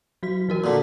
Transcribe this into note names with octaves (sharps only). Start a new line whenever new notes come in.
F#3 F#4 B6
E3 F#4 A#4
A#2 D3